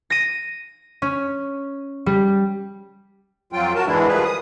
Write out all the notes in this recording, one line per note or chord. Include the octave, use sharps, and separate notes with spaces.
A#6 D#7
C#4
G3
F2 F#3 F4 G5
F#4 A#4 A5
E2 G#2 E3 G#3 D4 E4
D#3 F3 G3 G#4 B4
D#6